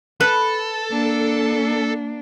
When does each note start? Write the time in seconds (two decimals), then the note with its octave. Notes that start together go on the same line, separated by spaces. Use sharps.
0.21 A4 B4
0.91 A#3 D4